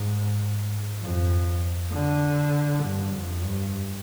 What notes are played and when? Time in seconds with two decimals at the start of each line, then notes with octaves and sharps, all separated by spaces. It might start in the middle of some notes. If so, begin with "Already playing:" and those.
Already playing: G#2
1.02 F2
1.93 D3
2.84 G2
3.14 F2
3.44 G2